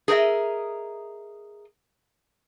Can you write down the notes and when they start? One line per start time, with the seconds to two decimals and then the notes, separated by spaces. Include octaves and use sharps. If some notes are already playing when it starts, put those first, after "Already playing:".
0.08 G#4 A#4 B4 D#5 E5